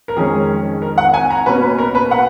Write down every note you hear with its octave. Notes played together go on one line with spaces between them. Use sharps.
A#4
F2 D#3 G#3 C#4 G#4
A#4
F#5
G#5
A#5
B2 A#3 C#4 B4
B4
A#4
B4
F#5